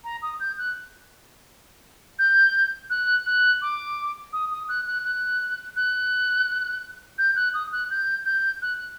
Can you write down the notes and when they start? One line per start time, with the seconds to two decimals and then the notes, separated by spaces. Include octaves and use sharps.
0.04 A#5
0.22 D#6
0.40 G6
0.58 F#6
2.19 G6
2.90 F#6
3.26 F#6
3.62 D6
4.33 D#6
4.51 D#6
4.69 F#6
4.86 F#6
5.04 F#6
5.76 F#6
7.18 G6
7.36 F#6
7.54 D#6
7.72 F#6
7.90 G6
8.26 G6
8.62 F#6